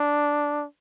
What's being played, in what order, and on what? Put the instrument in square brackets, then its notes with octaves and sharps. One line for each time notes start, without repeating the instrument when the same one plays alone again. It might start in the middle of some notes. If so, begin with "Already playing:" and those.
Already playing: [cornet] D4